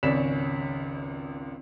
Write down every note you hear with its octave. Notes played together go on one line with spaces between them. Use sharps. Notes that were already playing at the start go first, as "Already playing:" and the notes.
G#1 C#2 C#4 D5 B6 E7